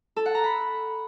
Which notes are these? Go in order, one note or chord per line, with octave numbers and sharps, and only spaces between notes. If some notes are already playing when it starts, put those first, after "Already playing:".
A4
F#5
A#5
B5